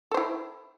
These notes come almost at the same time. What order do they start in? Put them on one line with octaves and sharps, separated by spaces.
A4 C5 E4